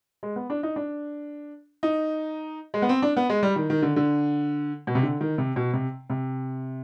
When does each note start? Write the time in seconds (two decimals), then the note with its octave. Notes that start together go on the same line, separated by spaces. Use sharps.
0.23 G#3
0.36 B3
0.50 D4
0.63 D#4
0.76 D4
1.83 D#4
2.74 G#3
2.82 B3
2.89 C4
3.02 D4
3.17 B3
3.30 G#3
3.43 G3
3.56 D#3
3.70 D#3
3.82 D3
3.96 D3
4.87 B2
4.95 C3
5.03 D3
5.21 D#3
5.38 C3
5.56 B2
5.73 C3
6.10 C3